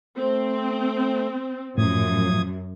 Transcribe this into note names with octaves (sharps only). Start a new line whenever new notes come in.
A3 C4
F#2 A2 F3 D#6 G#6